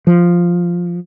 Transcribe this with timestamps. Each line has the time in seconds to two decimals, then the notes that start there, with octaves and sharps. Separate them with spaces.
0.07 F3